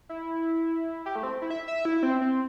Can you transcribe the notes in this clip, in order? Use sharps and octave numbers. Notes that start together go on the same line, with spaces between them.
E4
G4
A3
C4
E4
E5
E5
E4
C4
C4